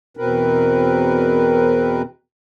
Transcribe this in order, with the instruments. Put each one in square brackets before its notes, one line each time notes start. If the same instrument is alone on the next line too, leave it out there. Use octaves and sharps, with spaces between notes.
[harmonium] E2 B2 C4 A#4 B4